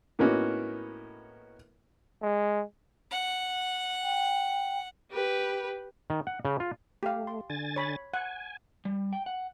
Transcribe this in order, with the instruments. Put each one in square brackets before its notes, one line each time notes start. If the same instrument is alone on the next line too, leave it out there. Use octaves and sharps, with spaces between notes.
[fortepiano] A2 A#3 B3 C#4 D#4 F#4
[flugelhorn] G#3
[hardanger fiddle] F#5
[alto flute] G5
[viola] G4 B4
[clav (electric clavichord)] D#3
F#5
C#3
F4
[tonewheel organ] A3 [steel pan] G4 F5
[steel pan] C6
[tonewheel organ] D3 G#5 A6
[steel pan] C#5 B5
[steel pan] F#5 [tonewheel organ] G#5
[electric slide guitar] G3
G5
F#5